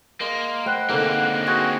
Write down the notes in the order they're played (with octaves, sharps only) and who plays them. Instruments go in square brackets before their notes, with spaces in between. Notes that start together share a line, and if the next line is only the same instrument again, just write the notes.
[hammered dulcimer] G#3 [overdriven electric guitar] A#3
[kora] B4 C5 G5 [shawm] F#5
[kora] G#2 D3 [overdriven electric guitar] A#3 C4
[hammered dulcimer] F#4 G#4 C5 [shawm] F#5